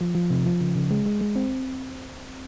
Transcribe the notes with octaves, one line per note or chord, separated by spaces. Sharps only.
F3
F3
C3
F3
C#3
C#3
G#3
G#3
G#3
C4